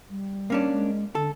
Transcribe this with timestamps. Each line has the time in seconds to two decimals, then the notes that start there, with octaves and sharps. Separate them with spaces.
0.10 G3
0.50 A#3 C#4 D4
0.71 G#3
1.15 D3 A4